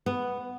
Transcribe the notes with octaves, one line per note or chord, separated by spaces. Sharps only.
B3